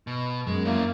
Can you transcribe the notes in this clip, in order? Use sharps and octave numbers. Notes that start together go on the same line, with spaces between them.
B2
F#2 G#3
A#3 C#4 E4